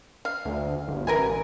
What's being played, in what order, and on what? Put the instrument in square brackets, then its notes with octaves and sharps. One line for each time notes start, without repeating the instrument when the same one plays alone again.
[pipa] F5
[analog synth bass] D2
G1
[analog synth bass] A1 [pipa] A#4 B4 G#5